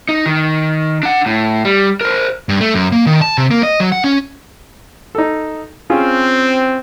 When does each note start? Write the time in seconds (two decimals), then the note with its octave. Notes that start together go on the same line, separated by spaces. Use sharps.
0.09 D#4
0.26 D#3
1.03 D4 F#5
1.26 A2
1.65 G3
2.01 A#4 C5
2.49 G2
2.61 A3
2.74 F#2
2.92 A#3
3.06 D#3
3.21 A5
3.38 C3
3.51 A#3
3.63 D#5
3.80 F#3
3.92 F#5
4.04 C#4
5.15 D#4 A4
5.90 C4 C#4 F4 G#4